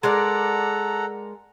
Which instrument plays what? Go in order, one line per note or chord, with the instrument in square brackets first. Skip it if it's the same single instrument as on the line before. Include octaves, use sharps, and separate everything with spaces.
[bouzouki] G#3 A#4 D5 [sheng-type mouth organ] A4 F#5 A#5